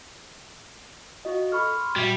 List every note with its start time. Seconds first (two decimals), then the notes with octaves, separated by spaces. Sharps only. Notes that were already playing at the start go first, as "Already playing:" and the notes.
1.25 F4 F#4 D#5
1.52 A4 B5 C#6 F6
1.77 C6
1.96 A#2 G3 F#4 E5